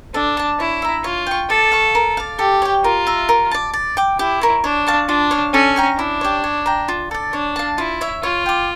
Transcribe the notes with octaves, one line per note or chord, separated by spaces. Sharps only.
D4 A4
D5 A5
E4 C#5
E5 A#5
F4 C#5
G5 C#6
A4 D5
F5 C#6
A#4
D5 F5
G4 A4
C#5 G5
F4 A#4
E5 A#5
A#4
D5 A5
D5
G5 D6
E4 G4
A#4 C#5
D4 C#5
F5 A5 C#6
D4 F4
C#5 F5
C#4 A4
C#5 G5 A#5
D4 E4
G4 C#5
C#5
G5 A#5
F4
A4 D5
D4 C#5
F5 A5
E4 F4
C#5 E5
F4 C#5
G5 D6